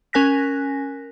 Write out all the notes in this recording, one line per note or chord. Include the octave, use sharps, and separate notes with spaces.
C#4 A#4 G#5 F#6 A#6 B6